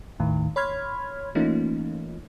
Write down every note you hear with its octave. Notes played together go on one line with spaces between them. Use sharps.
G#1 D#2 A2 D#3
C#5 B5 C6 F6 G#6
E3 A3 A#3 C#4 D#4 F4